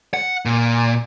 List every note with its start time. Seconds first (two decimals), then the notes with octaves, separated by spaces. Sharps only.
0.14 F#5
0.45 A#2